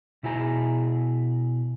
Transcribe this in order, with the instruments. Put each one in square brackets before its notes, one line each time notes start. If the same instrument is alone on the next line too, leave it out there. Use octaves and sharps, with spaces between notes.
[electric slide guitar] B2 E4 G#4 A#4 A#5